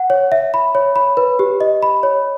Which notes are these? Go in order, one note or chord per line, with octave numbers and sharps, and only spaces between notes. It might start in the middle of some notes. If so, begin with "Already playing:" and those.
Already playing: F#5
C#5
E5
B5
C#5
B5
B4
G4
D#5
B5
C#5